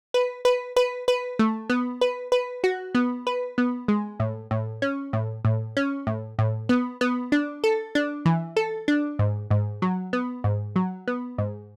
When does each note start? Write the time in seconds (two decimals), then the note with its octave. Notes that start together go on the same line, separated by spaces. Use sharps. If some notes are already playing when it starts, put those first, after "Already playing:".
0.14 B4
0.45 B4
0.76 B4
1.08 B4
1.39 A3
1.70 B3
2.01 B4
2.32 B4
2.64 F#4
2.95 B3
3.27 B4
3.58 B3
3.88 G#3
4.20 A2
4.51 A2
4.82 C#4
5.13 A2
5.45 A2
5.77 C#4
6.07 A2
6.39 A2
6.69 B3
7.01 B3
7.32 D4
7.64 A4
7.95 D4
8.26 E3
8.57 A4
8.88 D4
9.19 G#2
9.51 G#2
9.82 F#3
10.13 B3
10.44 G#2
10.76 F#3
11.08 B3
11.38 G#2